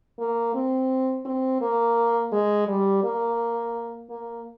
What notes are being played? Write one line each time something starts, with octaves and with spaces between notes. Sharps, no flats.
A#3
C4
C4
A#3
G#3
G3
A#3
A#3